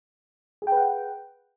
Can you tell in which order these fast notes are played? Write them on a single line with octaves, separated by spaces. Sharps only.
G#4 G5 B4 F#5